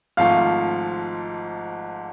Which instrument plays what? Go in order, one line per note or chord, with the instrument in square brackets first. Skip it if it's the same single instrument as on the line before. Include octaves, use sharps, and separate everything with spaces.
[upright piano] G#1 G#2 F3 A3 F5